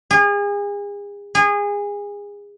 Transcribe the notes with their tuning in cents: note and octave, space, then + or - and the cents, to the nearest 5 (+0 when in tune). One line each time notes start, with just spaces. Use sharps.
G#4 -35
G#4 -25